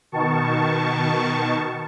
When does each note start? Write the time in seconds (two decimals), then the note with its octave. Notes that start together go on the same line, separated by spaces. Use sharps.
0.12 B2 D#3 A5 C#6